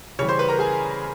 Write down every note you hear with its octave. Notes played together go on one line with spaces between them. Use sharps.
C#3 E3 G3 C#5 C#6
C5 C6
B4 B5
A#4 A#5
G#4 G#5